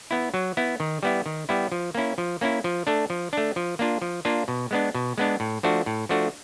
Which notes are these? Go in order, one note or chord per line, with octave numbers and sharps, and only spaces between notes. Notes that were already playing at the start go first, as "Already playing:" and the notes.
B3 E4
F#3
B3 E4
D#3
G3 B3 E4
D#3
G3 B3 E4
F3
A#3 C#4 E4
F3
A#3 C#4 E4
F3
A3 D4
F3
A3 D4
F3
A#3 D4 F4
F3
A#3 D4 F4
B2
G#3 B3 D4
B2
G#3 B3 D4
A2
F3 A3 D4 F#4
A2
F3 A3 D4 F#4